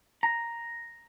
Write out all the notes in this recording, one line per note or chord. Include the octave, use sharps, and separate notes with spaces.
A#5